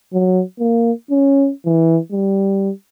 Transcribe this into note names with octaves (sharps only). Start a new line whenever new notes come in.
F#3
A#3
C#4
E3
G3